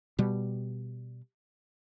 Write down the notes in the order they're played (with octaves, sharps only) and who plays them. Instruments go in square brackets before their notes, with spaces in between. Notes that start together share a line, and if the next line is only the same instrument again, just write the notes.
[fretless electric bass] B2 G3